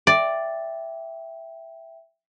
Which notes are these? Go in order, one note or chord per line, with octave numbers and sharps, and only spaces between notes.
D5 E5 G5